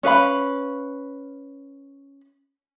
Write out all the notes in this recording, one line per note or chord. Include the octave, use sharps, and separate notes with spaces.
C#4 B4 F5 B5